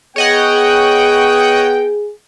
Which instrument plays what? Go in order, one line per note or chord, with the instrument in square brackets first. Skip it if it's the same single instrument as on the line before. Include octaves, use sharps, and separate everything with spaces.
[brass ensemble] B3 G5 [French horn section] G#4 [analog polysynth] C#5 D#5 F#5